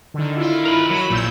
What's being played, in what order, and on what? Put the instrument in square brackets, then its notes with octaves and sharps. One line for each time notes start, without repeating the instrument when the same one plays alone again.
[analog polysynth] D3 D#3
D#3 E4 F4
[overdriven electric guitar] A#4 B5
[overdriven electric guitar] F#3 [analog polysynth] B5
[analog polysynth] A#1 E6 G6 [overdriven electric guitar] A#2